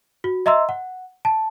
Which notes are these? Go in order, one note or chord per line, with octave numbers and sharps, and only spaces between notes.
F#4
D#5 E5 A#5 C6 E6
F#5
A5